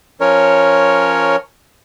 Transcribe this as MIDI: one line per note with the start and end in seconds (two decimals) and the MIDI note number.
0.20 1.36 53
0.20 1.36 61
0.20 1.36 70
0.20 1.36 73